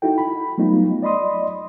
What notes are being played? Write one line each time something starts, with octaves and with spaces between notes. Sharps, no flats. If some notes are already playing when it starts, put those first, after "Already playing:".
D#4 E4 F#4 A4 G5
B5
F#3 G3 A3 B3 D#4 F4
D5 D#5 B5 C6 D#6